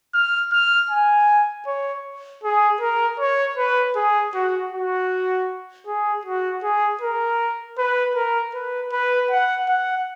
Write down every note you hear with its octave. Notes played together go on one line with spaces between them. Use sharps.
F6
F6
G#5
C#5
G#4
A#4
C#5
B4
G#4
F#4
F#4
G#4
F#4
G#4
A#4
B4
A#4
B4
B4
F#5
F#5